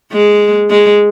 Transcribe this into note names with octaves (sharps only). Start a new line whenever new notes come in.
G#3
G#3